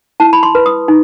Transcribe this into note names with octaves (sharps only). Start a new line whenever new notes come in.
E4 A5
B5
C6
B4
D#6
D#4